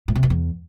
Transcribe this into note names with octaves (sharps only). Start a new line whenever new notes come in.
A2
C3
F#2
E2